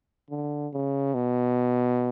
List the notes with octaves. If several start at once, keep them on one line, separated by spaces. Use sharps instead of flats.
D3
C#3
B2